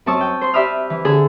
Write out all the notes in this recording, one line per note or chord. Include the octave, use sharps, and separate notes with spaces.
F#2 C4 A5 C#6 D#6 E6
G5
C5 C6
G4 D5 E5 B5 D#6 F6
E3
D3 G#4 A4